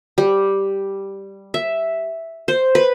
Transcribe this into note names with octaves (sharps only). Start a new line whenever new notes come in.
G3
E5
C5
B4